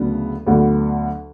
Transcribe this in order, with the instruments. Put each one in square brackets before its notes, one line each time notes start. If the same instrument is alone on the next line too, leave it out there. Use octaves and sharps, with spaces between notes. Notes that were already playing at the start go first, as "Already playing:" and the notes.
Already playing: [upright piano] D2 C#3 F#3 B3 D4
D2 D3 F#3 B3